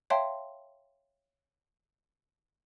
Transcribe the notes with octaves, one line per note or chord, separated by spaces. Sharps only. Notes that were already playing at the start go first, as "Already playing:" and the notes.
C#5 E5 F5 G5 A5 C6